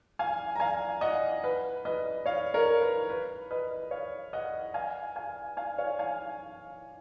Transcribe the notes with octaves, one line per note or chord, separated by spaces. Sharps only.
F5 G#5
A#5
F5 G#5
D#5 F#5
B4
B4 D#5
C#5 F5
A#4 C#5
B4
B4
B4 D#5
C#5 F5
D#5 F#5
F5 G#5
F5 G#5
F5 G#5
C#5 F5
F5 G#5